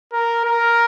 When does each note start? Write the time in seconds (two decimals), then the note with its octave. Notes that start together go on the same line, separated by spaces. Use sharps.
0.13 A#4
0.45 A#4